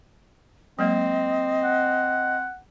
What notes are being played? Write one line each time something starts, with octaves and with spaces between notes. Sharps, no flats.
F#3 G#3 A#3 C4 D#5
F#5